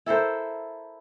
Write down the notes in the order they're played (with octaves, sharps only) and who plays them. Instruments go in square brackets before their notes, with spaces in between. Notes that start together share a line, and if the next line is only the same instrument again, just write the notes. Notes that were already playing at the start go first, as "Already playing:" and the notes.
[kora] E4 A4 A#4 C5